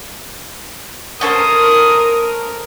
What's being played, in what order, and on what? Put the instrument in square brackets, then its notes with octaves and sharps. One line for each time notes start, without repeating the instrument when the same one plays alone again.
[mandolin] A3 C#4 C5 [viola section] A#4 [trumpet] D#6